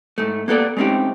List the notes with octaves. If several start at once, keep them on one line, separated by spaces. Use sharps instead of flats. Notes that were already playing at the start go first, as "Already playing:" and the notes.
G#2 A3
A#3 B3 A4 D5
G#3 A3 C4 C#4 D#4 G4